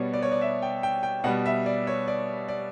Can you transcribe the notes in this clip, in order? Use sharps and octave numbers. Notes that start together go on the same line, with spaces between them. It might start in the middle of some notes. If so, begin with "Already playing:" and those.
Already playing: B2 G3 B3 C#5 D5
D5
C#5
D5
E5
G5
G5
G5
B2 G3 B3 F#5
E5
D5
C#5
D5
D5